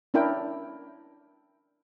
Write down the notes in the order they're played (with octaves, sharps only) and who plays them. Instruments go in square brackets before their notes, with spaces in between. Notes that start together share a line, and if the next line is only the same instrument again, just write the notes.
[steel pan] C#4 D4 E4 A#4 G5